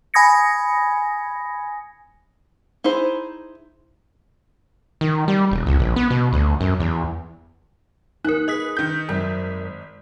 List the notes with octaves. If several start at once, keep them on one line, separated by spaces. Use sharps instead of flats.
G#5 B5 D#6 G#6 A#6 C#7
D#4 E4 G#4 C5
D#3
G3
E1
C#2
A#1
B3
B2
D2
F#2
E2
D#2 D#4 A#4 F#6
G#4 B4 D#5 D#6 B6
D#3 G6
G#1 F#2